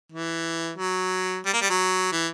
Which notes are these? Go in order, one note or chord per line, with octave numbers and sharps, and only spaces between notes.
E3
F#3
G3
A#3
G3
F#3
E3